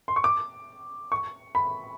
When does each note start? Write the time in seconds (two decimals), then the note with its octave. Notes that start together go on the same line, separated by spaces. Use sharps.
0.08 C6
0.16 C#6
0.24 D6
1.12 C#6
1.55 B5